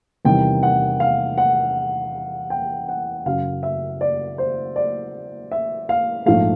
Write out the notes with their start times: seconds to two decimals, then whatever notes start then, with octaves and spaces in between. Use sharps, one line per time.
0.25 E2 C3 D#3 G3 G5
0.63 F#5
1.00 F5
1.38 F#5
2.50 G5
2.89 F#5
3.25 F#2 C#3 F#3 F5
3.63 E5
4.01 D5
4.38 C5
4.76 D5
5.51 E5
5.89 F5
6.26 A#1 G#2 F3 A3 F5